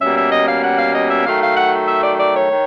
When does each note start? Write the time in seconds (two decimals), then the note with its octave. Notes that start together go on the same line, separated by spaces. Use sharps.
0.02 B2 G3 A#3 C#4 E5
0.17 E5
0.32 D#5
0.48 F5
0.64 F#5
0.79 F5
0.95 D#5
1.10 E5
1.26 D#3 F#3 A3 F5
1.42 F5
1.57 F#5
1.88 E5
2.04 D5
2.20 D5
2.35 C#5
2.50 D#3